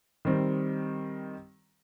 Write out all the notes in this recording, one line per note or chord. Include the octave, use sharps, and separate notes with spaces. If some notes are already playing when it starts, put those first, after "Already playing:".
D#3 G3 C4